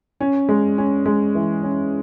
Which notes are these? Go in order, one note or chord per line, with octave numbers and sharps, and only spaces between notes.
C#4
G#3
C#4
G#3
E3
C#4